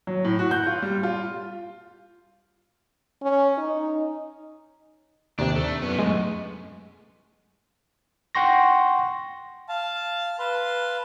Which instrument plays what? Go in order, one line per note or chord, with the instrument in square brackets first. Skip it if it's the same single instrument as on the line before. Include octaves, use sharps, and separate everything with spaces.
[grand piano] F#3
A2
F#4
G6
F4
G3
F4
[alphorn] C#4
D#4
[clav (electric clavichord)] D#2 C3 [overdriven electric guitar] D4
[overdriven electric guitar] A3
F#2 B3
[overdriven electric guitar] F#2 A2 [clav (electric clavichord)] G#3
[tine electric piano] F#5 G5 C6 C#6 A#6
[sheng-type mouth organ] F5 A5
B4 F5 A5 C6